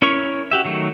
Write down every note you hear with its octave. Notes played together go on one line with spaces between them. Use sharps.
C#4 E4 A#4 C#5 C#6
F#4 G4 E5
D#3 F#3 A3